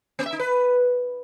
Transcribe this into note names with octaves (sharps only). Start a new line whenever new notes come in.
B3
E5
D#4
B4